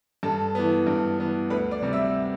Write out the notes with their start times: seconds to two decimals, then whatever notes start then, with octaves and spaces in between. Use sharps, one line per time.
0.23 G2 A4 A5
0.55 E3 B3
0.87 G2
1.18 E3 B3
1.50 D2 B4 B5
1.71 D5 D6
1.82 C3 G3
1.93 E5 E6